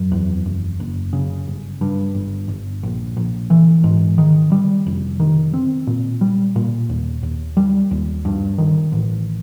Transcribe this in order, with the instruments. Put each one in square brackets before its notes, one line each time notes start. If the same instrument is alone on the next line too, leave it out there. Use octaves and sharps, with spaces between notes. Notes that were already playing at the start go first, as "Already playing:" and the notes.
Already playing: [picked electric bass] F#2
E2
F#1
F#1
C#3
G1
G2
G1
G1
A#1
A#1
E3
G#2
D#3
G3
F1
D#3
C4
A#2
G3
A#2
D#2
D#2
G3
D#2
G2
D#3
A1